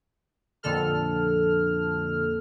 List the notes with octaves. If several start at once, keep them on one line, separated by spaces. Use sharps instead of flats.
F2 A#2 D3 A4 F6